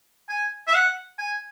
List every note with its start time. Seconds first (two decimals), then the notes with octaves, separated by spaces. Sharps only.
0.29 G#5
0.67 E5
0.74 F#5
1.18 G#5